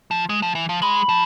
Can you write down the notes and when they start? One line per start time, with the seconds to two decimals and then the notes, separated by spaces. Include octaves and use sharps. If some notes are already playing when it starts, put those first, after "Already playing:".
0.11 F3
0.29 G#3
0.42 F3
0.55 E3
0.69 F3
0.82 G#3 B5
1.09 F3